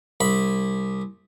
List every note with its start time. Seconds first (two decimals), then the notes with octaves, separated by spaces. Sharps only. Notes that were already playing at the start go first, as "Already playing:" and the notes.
0.20 C2 B5